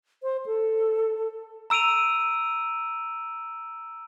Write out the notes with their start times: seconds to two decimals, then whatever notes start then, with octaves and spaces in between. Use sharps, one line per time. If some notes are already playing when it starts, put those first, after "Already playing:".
0.23 C5
0.46 A4
1.70 A#5 E6 D7 D#7 F7